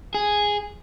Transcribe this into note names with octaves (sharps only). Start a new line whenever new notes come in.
G#4